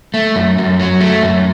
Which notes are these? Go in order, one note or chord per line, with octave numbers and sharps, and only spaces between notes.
A3
F#2
F#2
F#3
A3
F#2